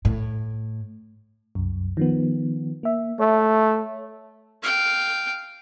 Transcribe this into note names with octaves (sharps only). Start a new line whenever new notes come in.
A2
C2 F#2
D#3 F3 B3
A#3 E5
A3 C#5 E5
F5 G5